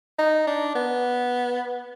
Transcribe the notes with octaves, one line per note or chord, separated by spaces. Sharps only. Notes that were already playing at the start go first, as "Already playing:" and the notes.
D#4
D4
B3